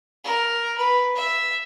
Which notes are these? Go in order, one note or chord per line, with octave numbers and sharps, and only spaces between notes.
A#4
B4
E5